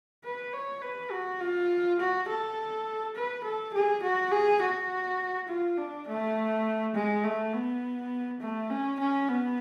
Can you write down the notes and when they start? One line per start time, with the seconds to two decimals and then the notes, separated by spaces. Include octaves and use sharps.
0.25 B4
0.53 C#5
0.82 B4
1.11 F#4
1.41 F4
2.00 F#4
2.28 A4
3.16 B4
3.44 A4
3.74 G#4
4.03 F#4
4.32 G#4
4.62 F#4
5.49 F4
5.78 D4
6.07 A3
6.95 G#3
7.24 A3
7.53 B3
8.41 A3
8.70 C#4
8.99 C#4
9.29 B3